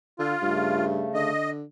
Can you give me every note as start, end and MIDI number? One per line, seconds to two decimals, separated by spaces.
0.19 0.35 50
0.19 0.85 65
0.42 1.09 43
0.42 1.31 49
0.42 1.31 57
1.14 1.64 50
1.14 1.50 75